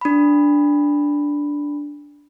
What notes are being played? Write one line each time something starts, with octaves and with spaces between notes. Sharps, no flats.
D4 B5